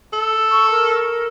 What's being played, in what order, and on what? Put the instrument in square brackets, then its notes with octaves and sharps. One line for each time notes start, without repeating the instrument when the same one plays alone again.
[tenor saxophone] A4
[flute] C#6
A#4